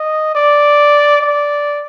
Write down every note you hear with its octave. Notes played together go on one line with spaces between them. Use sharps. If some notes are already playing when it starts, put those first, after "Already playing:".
Already playing: D#5
D5
D5